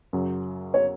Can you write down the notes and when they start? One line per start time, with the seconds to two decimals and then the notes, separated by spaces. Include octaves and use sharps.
0.13 F#2 C#3 F#3
0.74 C#5